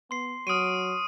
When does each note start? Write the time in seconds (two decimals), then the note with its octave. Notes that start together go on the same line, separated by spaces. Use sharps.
0.11 B3 C6 C7
0.47 F#3 C#6 D#6 F6 D7 D#7